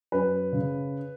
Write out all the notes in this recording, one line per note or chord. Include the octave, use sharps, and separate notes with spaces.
F#2 B4
C#3